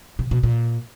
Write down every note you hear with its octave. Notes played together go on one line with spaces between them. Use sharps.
C3
B2
A#2